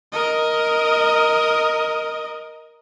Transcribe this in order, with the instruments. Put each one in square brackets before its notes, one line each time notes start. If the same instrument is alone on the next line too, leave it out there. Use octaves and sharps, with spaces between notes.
[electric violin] A#4 D#5